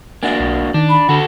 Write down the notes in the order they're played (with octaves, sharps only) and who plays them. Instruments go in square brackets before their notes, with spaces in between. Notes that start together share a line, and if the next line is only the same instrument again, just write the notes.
[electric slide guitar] A#3 D4 F#4 [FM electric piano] E5 F#5 G#5
[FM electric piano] B1
[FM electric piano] D#3 [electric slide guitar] D4
[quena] B5
[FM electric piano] D3 [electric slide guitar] F#4 A4